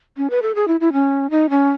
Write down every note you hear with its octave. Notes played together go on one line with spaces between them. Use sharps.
C#4
B4
A4
G#4
E4
E4
C#4
D#4
C#4